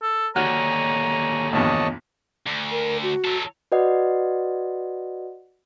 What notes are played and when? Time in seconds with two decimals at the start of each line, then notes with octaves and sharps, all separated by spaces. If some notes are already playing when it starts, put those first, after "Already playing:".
0.02 A4
0.36 D#2 D3 F#4 C#5 G#5 A#5 F6 F#6
1.53 E2 G2 A#2 C#5 D#5 A5
2.46 D2
2.71 A#4
3.03 F#4
3.25 F#3 A4
3.72 F#4 B4 D5 D#5 F#5